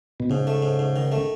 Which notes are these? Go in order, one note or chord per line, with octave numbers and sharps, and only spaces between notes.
B2
G#2 C#3
A3
G#2
G#2
D#3
A3